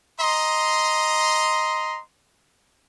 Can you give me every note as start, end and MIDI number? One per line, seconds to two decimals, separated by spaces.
0.20 1.99 75
0.20 1.99 82
0.20 1.99 84